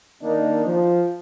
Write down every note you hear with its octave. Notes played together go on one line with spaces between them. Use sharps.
D#3 A#3 D4 D#4
F3